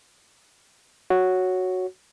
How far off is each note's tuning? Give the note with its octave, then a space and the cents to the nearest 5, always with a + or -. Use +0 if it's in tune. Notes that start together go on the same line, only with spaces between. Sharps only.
F#4 +0 C#5 +0